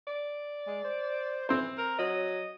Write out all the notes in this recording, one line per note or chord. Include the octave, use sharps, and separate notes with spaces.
D5
G#3
C5
E3 C4 C5
A#4
F#3 D#5